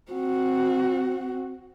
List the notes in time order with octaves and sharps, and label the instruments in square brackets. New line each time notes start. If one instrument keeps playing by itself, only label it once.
[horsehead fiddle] C4 F#4